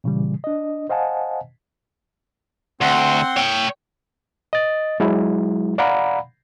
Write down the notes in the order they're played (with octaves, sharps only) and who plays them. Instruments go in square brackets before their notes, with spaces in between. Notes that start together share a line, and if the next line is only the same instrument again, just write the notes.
[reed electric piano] A#2 C#3 E3 G3
D4 D#5
C5 D#5 F5 F#5 G#5 A5
[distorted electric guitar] D2 [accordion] C4 F#5 C6
[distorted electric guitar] C#5 G5
[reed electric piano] D#5 A6
F#3 G#3 E4
D5 F5 F#5 A#5 B5